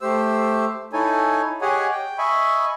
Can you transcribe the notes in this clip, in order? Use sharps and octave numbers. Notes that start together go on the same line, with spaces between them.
A3 G4 C5 E6
D#4 E4 A4 C#5 G#5
G4 G#4 C#5 D#5 F#5 G#5
G5
D#5 E5 G#5 B5 C#6